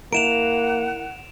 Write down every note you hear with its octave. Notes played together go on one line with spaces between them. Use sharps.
A#3 E4 A#4 F#5 D7 E7 F7